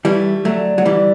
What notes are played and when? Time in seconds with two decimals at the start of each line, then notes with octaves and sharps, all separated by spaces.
0.05 E3 G3 A3
0.45 D3 F#3 A3
0.78 F#3
0.85 D3 E3 G3